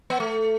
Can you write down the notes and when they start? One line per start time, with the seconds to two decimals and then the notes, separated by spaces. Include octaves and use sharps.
0.10 B3
0.20 A3